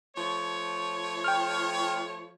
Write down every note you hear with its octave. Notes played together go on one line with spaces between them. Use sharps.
F3 A3 C#5
G5 F6